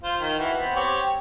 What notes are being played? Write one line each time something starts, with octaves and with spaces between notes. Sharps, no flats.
F4 C5
D#3 D#5
E3 F#4
B3 C4
C4 G4 C#5